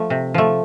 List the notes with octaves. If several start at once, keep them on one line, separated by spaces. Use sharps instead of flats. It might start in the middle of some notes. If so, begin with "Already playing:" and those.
Already playing: F3 A3
C3
F3 A3